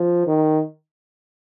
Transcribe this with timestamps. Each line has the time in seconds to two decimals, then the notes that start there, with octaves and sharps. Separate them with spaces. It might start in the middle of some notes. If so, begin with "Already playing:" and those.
Already playing: F3
0.27 D#3